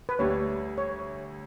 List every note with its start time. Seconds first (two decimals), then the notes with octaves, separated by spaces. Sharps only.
0.09 B4
0.19 D2 D3 G3 C#5
0.78 C#5